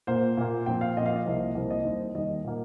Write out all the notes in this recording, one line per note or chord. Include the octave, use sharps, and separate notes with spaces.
A#2 A#3 C5
A#2 A#3
A#2 F3 C4 G5
F5
A#2 F3 C4 D#5
F5
D#5
C2 C3 F3 A#3
C2 C3 F3 A#3 C5
D#5
D#2 D#3 G3 C5
D#2 D#3 G3 D#5
A#2 A#3